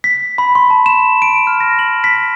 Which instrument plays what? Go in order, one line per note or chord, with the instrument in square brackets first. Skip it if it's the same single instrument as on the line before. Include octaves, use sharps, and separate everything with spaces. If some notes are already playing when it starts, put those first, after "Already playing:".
[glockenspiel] B6
B5
C6
A5
E7
D7
F6
A#6
F#7
B6